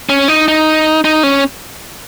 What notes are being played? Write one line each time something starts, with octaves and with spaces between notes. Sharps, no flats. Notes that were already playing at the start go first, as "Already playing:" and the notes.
C#4
D#4
D#4
D#4
C#4